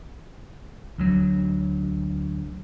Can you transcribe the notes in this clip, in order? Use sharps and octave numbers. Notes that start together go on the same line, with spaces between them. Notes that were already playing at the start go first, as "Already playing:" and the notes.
D2 F#3